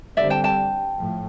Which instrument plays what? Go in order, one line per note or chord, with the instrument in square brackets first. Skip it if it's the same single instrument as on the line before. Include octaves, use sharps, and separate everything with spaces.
[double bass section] D3 G3 C4 [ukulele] D5 E5
[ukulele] G5 A5
G5 A5
[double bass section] A2 F3